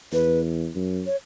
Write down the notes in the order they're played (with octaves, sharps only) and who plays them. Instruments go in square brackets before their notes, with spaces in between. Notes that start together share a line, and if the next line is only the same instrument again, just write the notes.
[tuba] E2 [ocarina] B4
[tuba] F#2
[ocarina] C#5